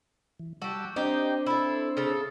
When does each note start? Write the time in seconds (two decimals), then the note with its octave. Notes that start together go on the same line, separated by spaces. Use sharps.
0.40 E3
0.62 G3 F#4 G4 A5 E6
0.96 C4 D4 D#4 G4 C5
1.46 E4 A4
1.97 C#3 A4